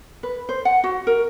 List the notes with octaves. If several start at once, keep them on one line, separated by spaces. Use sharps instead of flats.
B4
C5
F#5
F#4
A#4